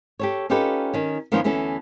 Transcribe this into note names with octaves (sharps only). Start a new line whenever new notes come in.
G4 A4 C#5
C#4 D#4 F4 G4 A4 B4
D#3 C#4
D#3 F3 A#3 B3 C#4 F4
D2 E3 B3 C#4 A4